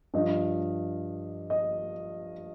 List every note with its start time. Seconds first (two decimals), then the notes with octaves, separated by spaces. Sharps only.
0.14 G2 F3 D#5
1.50 D#5